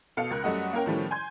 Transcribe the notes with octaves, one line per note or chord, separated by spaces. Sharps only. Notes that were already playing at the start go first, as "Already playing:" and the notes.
B2 A4 F5 C#7
C#2 A#4 F#6
F#2 G3 A3 D#5 F#5
A#3 C#4 A#4 G5
A2 D#3 F3 G3 A3 C#4
G#5 C6 G6 G#6